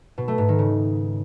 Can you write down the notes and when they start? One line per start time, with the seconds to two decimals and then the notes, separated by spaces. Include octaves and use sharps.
0.18 B2
0.28 A3
0.38 G#2
0.48 D#3
0.59 C#3